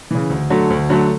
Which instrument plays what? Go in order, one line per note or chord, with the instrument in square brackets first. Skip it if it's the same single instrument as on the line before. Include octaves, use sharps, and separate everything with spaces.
[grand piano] C#3 E3
D2
D3 F#3 A3
D2
D3 F#3 A3